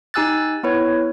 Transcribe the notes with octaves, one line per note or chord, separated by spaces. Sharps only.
D#4 G4 G#5 E6 F#6 A6
B3 E4 B4 C#5